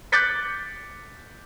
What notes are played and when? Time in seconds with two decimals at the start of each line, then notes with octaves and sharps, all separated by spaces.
0.12 D6 F#6 G6 A6 B6 C#7